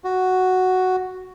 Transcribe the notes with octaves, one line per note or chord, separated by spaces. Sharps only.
F#4